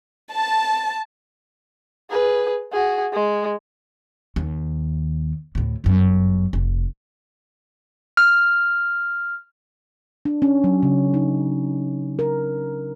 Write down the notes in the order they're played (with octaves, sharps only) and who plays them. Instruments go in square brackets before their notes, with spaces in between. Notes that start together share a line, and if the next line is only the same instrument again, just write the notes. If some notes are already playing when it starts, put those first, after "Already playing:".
[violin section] A5
[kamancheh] G#4 B4
F#4 G#4
G#3
[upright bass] D#2
D2 A2
G1 F#2
F1
[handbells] F6
[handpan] D4
C#4
F#3
C#3
D#4
A#4